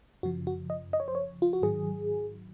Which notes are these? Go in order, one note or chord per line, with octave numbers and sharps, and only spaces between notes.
F#2 C#3 F3 F#4
F#4
D#5
D#5
C#5
C5
C#5
F4
F#4
G#2 D#3 F#3 G#4